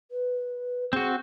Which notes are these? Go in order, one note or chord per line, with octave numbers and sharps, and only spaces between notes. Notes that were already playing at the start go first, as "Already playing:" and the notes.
B4
C4 F#4 G#4